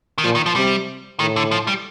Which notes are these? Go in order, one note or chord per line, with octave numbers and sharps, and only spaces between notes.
D#3
A#2 F3
D#3
F3
C3 G3
A2 D#3
D3
F3
G3